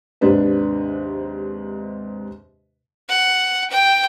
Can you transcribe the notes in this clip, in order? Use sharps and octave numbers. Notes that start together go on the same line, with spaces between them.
D#2 G#2 C3 D4 B4
F#5
G5